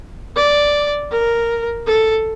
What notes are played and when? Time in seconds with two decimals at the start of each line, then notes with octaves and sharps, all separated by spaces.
0.37 D5
1.12 A#4
1.87 A4